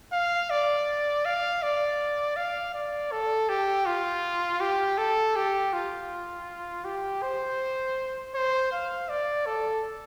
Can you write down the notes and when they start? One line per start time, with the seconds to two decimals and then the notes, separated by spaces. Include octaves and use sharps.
0.12 F5
0.50 D5
1.25 F5
1.62 D5
2.37 F5
2.74 D5
3.12 A4
3.49 G4
3.86 F4
4.61 G4
4.98 A4
5.36 G4
5.73 F4
6.85 G4
7.22 C5
8.35 C5
8.72 F5
9.09 D5
9.46 A4